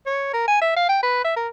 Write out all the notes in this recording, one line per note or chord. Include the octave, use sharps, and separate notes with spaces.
C#5
A#4
G#5
E5
F5
G5
B4
E5
A#4